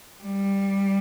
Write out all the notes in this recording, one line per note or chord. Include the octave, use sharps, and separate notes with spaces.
G3